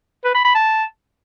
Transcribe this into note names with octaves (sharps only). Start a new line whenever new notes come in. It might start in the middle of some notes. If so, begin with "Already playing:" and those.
B4
B5
B5
A5